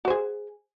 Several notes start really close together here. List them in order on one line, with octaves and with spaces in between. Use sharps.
F#4 C5 G#4